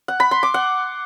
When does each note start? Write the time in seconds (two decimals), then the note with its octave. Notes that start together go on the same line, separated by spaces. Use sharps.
0.08 F#5
0.20 B5
0.31 C6
0.43 D6
0.54 F#5